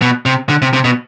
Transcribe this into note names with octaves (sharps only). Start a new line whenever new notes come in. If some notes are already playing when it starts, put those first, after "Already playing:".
B2
C3
D3
C3
C3
B2